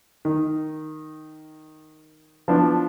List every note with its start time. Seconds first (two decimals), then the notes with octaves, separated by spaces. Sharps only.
0.25 D#3
2.48 F3 B3 D4